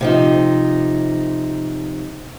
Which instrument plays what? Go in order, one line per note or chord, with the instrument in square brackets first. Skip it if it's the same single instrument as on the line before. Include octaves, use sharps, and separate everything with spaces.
[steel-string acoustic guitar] C3 F3 D#4